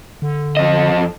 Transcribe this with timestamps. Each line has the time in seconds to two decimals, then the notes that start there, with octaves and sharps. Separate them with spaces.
0.22 D3
0.57 F2 D#5